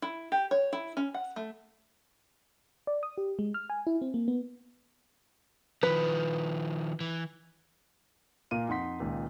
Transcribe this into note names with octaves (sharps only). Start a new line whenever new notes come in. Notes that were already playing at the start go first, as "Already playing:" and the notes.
E4
G4
C#5
E4
C#4
F#5
A3
D5
D#6
G4
G#3
F6
G#5
E4
C4
A#3
B3
D#3 F3 B4
E3
A#2 A#3 F5 D#7
F2 D#4 F#5 C6 B6
C#2 A#2 D#3